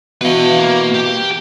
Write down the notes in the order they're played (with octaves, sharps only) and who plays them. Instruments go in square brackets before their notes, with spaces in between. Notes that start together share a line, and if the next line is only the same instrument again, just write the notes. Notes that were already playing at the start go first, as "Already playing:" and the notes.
[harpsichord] B2 E3 [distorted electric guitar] B4 F5
[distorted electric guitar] A#3
G4